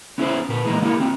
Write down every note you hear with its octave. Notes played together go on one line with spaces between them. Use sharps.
B3 C#4 E4 G#4 B4 C5
A#2 B4
E3 G#3 A#3 B3 D#4
D#3 A#3 E4 G4 A#4
C4 F4 F#4